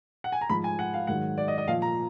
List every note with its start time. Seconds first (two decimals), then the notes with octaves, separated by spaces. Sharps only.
0.24 F#5
0.32 G#5
0.41 A#5
0.49 G#2 F3 B5
0.64 G#5
0.79 F#5
0.94 F5
1.07 G#2 D#3 F#3 F#5
1.38 D5
1.48 D#5
1.58 D#5
1.68 A#2 F3 F5
1.82 A#5